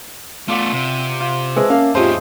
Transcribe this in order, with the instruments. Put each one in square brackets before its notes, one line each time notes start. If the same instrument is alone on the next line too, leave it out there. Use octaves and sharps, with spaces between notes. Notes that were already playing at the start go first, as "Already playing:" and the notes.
[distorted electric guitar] A3 B3 [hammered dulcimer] F4 D5 F#5
[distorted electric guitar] C3
[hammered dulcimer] F4
[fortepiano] G#3 [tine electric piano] G#4 B4 C5 [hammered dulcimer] E5 A5
[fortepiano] A#3 F5 [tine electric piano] C#4
[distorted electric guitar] F2 A2 [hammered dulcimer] C#3 D#5 [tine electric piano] F4 G4 A5 [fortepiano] C5